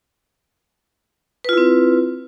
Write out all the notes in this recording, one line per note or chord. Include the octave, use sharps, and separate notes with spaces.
C4 E4 F4 B4